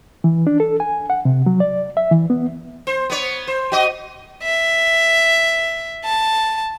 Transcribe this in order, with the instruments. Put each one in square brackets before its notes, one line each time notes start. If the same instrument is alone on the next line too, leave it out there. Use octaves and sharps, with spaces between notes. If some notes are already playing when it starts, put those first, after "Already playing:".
[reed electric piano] E3
D4
A4
G#5
F#5
C3
F#3
D5
E5
E3
B3
[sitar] C5
B3 C#5
C5
F#4 D#5
[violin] E5
A5